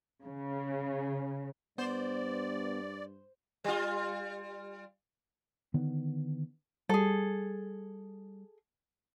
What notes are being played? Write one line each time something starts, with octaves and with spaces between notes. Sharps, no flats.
C#3
G2 B3 C5 D5
G3 F4
D3 D#3 B3
G3 G#4 A4